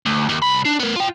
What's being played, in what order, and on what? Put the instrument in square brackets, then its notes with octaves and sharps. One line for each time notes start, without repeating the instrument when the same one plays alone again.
[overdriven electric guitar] D2
D#2
C2 B5
D4
B3 A#4
F4 G5